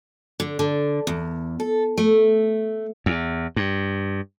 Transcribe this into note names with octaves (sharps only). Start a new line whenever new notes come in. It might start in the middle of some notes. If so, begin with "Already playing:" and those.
D3
D3
E2
A4
A3
E2
G2